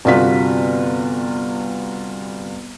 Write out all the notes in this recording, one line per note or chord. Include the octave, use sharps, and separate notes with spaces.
G1 C3 F4 F#4 B6